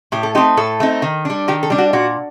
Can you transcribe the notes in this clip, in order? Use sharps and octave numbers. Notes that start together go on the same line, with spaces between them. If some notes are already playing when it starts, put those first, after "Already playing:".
A2 G4
A4
A3 C4 D#4 G4
A2 A4
A3 C4 D#4
D#3
G3 D4
D#3 G4
A4
G3 D4
F#4
A#2 F#4